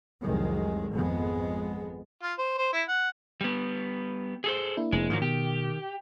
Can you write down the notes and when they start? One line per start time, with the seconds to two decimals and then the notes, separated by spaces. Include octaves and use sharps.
0.24 F1 C2 D#3 F#3 G#3
0.91 G#1 F2 G#3 B3
2.23 F4
2.39 C5
2.58 C5
2.73 E4
2.88 F#5
3.41 G3 B3
4.44 G#4 A4 C5
4.77 A#3 D4 E4
4.92 F1 G#3
5.10 G#2 D#3 F3 F#3
5.22 B2 G4